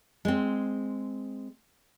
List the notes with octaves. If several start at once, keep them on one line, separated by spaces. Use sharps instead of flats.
G#3 C4